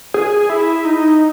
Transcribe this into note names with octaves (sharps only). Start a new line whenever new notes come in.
G#4
E4
D#4